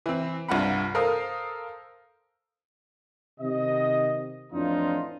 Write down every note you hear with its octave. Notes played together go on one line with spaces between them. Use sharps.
E3 C4
C2 G2 F4 F#5 B5
A4 A#4 C5 F5 D#6
C3 D#3 D#5
F2 A2 E3 D4 D#4 F4